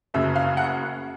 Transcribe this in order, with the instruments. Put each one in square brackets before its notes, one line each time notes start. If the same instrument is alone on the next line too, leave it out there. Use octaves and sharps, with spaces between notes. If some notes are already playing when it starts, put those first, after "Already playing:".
[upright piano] F#1 F#2 C#3 E5
F5
F#5